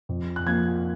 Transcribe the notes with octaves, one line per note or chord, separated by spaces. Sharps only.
F2
F#6
F3 A#3 G#6